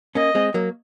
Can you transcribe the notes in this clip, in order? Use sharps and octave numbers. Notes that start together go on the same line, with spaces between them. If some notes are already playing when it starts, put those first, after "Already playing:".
A#3 C#4 D#5
G#3 C4
F#3 A#3